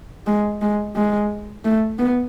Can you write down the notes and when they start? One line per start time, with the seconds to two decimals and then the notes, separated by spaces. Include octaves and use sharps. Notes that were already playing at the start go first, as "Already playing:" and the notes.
0.27 G#3
0.61 G#3
0.95 G#3
1.64 A3
1.99 B3